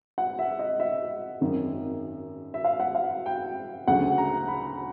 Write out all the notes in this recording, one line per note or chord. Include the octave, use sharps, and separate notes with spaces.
F#5
E5
D#5
E5
G#1 F#2 D#3
E5
F5
F#5
F5
G5
D2 C#3 F#3 F#5
A#5
B5